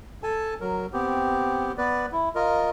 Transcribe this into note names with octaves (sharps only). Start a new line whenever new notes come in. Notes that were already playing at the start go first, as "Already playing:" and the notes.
A4 G#5 A5
F#3 A#4
B3 C4 G4
B3 B4 D5
E4
F4 A#4 D#5